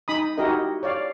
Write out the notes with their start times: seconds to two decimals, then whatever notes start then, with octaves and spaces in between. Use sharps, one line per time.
0.08 D#4 B5 D#6
0.38 D#4 E4 F#4 G4 A#4 D#5
0.83 C#5 D5 F5